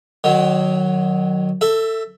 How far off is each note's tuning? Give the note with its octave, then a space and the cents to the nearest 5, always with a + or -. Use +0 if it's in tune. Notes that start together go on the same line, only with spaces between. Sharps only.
D#3 -30 F#3 +0
A4 +20 E5 +0